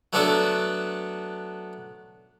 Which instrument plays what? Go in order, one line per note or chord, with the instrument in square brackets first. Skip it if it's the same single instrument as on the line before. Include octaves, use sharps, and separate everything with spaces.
[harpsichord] F#3 A3 B3 D4 F#4 A4